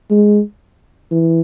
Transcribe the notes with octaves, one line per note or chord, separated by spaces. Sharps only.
G#3
E3